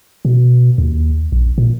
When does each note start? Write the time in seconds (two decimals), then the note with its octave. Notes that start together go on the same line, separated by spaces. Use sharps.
0.25 B2
0.78 D#2
1.32 A#1
1.58 A#2